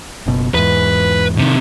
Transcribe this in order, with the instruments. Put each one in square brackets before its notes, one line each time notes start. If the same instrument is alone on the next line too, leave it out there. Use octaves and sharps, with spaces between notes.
[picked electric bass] F#1 B2
[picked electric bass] E2 G#2 [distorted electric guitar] B4
[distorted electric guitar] C3 D#3